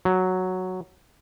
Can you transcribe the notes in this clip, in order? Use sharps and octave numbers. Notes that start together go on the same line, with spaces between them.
F#3